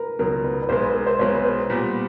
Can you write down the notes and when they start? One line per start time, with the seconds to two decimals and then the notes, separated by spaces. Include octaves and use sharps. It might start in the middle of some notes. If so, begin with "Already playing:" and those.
Already playing: A#4 B4
0.19 C#2 B2 F#3 A#4
0.44 B4
0.62 B4
0.69 B1 B2 G#3 C5
0.82 B4
0.94 A#4
1.07 C5
1.19 B1 B2 G#3 C#5
1.35 B4
1.45 C5
1.70 A#2 G3 B3